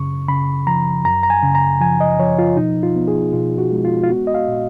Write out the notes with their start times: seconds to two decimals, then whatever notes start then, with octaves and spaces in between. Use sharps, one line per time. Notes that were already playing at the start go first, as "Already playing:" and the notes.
Already playing: F#2 C#3 C#6
0.28 C#3 B5
0.67 F3 A#5
1.05 F#2 A#5
1.23 A#5
1.30 G#5
1.43 C#3
1.55 A#5
1.81 F3 G#5
2.00 D#5
2.19 F3 C#5
2.39 F4
2.57 B2 D#4
2.83 F4
2.96 B3
3.08 G#4
3.33 B2 F4
3.58 F#4
3.72 G#3
3.85 F4
4.04 F4
4.09 B3 F#4
4.27 D#5
4.34 F5
4.47 A#2